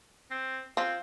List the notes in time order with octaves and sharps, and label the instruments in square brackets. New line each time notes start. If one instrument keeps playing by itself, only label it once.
[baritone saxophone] C4
[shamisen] F3 [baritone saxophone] C4